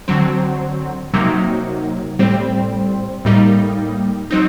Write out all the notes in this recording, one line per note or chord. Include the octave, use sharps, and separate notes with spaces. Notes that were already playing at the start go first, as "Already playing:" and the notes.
D3 F#3 C4
C3 F#3 A#3 D#4
A2 G3 C4
A2 G3 A#3 D#4
F#3 C4 D#4